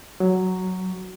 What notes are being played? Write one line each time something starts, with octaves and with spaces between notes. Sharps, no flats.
F#3